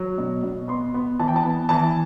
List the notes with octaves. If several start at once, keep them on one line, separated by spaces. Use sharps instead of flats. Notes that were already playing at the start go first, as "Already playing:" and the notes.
Already playing: F#3
B2
B2
B3 C6
B3
E3 A5
G5
A5
B3
E3 A5